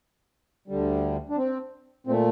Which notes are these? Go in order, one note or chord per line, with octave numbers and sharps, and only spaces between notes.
D2 D3 G3
D4
C4
A#2 A3 C4